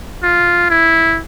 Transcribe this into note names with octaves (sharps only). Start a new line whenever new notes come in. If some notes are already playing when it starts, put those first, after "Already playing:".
F4
E4